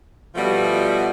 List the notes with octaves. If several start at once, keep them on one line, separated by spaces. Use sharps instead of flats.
B2 F3 G3 A3 B3